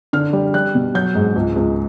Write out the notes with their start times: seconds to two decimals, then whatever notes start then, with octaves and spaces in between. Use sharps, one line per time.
0.13 D3 F6
0.33 G3
0.54 G3 F#6
0.75 B2
0.94 F#3 G6
1.15 G#2
1.36 C#2
1.56 C#2